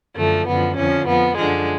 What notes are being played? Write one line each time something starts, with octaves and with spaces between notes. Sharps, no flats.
F#2 D3 F3 A3
F#2 D3 F3 B3
F2 D3 F3 C#4
F2 F3 B3
F#2 D3 F3 G#3